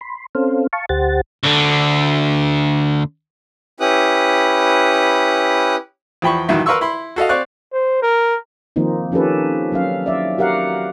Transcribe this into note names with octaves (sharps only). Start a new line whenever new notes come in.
B5 C6
C4 C#4 A4 C5 F5
F5 A5 C#6
D2 G4 C5 F#5 A6
D2 D3
C#4 E4 G4 B4 D#6 F#6
E2 F3 G5 B5 C#6
A#1 G2 D#3 E3 F#4 E5
A#4 B4 F5 C6 C#6 E6
E4 B5 C6
F#4 A4 D#5 F5
C4 D5 F5 C#6 F#6
C5
A#4
D#3 F3 A#3 C4 D#4
F3 C#4 G4 A4 B4
F#3 C#4 F5
D5 E5
F#4 G4 A#4 F5 F#5